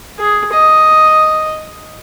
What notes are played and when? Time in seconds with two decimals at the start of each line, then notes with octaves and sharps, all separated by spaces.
0.19 G#4
0.53 D#5